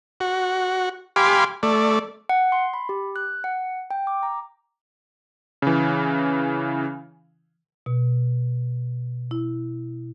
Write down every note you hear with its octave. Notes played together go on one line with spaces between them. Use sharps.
F#4
G4 F5 G#5 B5 C6 D6
A3 D5
F#5
C6
B5
G4
F#6
F#5
G5
D6
A#5
C#3 E3
B2
E4